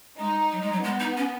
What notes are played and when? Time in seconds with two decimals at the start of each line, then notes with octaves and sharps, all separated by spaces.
0.19 G#3 D#4
0.52 F#3
0.61 G#3
0.72 F#3
0.84 G#3 B3
1.00 D#4
1.17 C#4